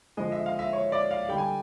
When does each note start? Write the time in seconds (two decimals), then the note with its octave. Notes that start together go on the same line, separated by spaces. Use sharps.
0.17 D3 F3 G#3 D#5
0.32 E5
0.46 F5
0.59 E5
0.73 C#5
0.92 D5
1.11 F5
1.29 D3 G3 G5
1.38 G#5